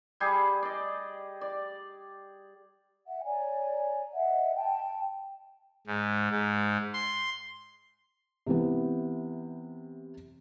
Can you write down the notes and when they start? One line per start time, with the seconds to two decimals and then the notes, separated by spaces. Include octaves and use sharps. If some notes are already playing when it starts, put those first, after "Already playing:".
0.20 G3 G4 G#4
0.63 D5 D#5
1.41 D5
3.07 E5 F#5
3.24 C#5 D5 G#5 A#5
4.13 D#5 E5 F#5
4.55 G5 A5
5.87 G#2
6.31 G#2
6.94 C6
8.46 C3 E3 B3